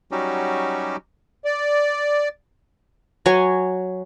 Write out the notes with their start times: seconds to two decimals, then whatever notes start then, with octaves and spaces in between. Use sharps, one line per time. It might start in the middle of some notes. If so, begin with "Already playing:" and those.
0.11 F#3 G3 C#4 D#4 F#4 G4
1.45 D5
3.26 F#3 C#5 G#5